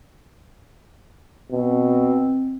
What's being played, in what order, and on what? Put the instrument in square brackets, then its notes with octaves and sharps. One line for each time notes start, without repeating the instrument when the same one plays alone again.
[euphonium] B2 [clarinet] C4